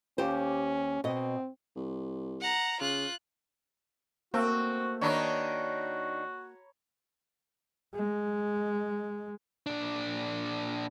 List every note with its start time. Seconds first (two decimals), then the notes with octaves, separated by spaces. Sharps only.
0.18 D#2 C#4 G4 C5
1.04 B2 C4 D#5
1.76 C2
2.41 F#5 A#5
2.81 C#3 F4 F#6
4.34 A3 A#3 C4 F#4
5.01 D#3 D4 D#4 F#4 C#5 A#5 B5
7.95 G#3
9.66 A#2 D4